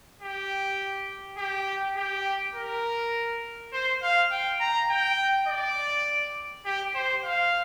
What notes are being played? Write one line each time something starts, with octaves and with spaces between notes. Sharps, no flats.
G4
G4
G4
A#4
C5
F5
G5
A#5
G5
D5
G4
C5
F5